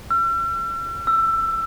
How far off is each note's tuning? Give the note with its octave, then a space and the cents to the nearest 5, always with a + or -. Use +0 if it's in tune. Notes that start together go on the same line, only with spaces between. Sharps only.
E6 +45
E6 +20